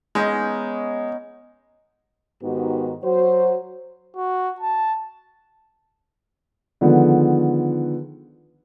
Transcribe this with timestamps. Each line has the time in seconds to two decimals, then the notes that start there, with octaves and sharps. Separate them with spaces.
0.15 G#3 B3 C#4 D#4
2.43 G#2 D#3 B3 D#4 F#4 G4
3.04 F#3 F#4 C5
4.16 F#4
4.60 A5
6.81 D3 D#3 F3 G#3 B3